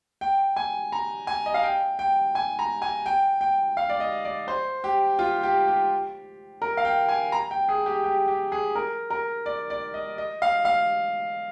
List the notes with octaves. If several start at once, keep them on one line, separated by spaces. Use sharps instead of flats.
G5
G#5
A#5
G#5
D#5
F5
G5
G5
G#5
A#5
G#5
G5
G5
F5
D5
D#5
D5
C5
G4
F4
G4
G4
A#4
F5
G5
G#5
A#5
G5
G#4
G4
G4
G4
G#4
A#4
A#4
D5
D5
D#5
D#5
F5
F5